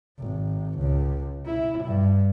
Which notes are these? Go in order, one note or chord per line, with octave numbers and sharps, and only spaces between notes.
G#1
C#2
E4
G2